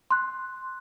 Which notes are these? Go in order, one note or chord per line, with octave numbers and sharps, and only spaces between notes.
C6 F#6